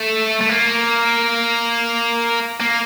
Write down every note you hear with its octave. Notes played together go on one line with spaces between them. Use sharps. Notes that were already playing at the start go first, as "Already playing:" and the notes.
Already playing: A3
A3
A#3
A#3